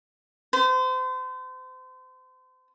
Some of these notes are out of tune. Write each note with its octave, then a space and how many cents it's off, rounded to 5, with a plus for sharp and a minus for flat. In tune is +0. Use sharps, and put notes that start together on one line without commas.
C5 -35